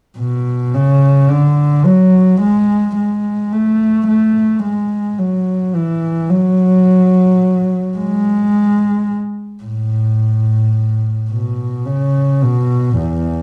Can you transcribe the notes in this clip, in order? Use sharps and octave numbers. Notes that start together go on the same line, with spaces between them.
B2
C#3
D3
F#3
G#3
G#3
A3
A3
G#3
F#3
E3
F#3
G#3
A2
B2
C#3
B2
E2